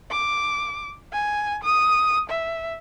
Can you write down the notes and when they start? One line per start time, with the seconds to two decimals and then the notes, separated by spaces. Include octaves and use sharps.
0.11 D6
1.12 G#5
1.63 D#6
2.30 E5